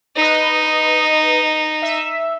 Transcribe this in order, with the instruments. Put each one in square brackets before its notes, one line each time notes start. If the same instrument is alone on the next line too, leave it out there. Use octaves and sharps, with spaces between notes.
[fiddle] D#4 [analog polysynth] B4 D#5
[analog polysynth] E5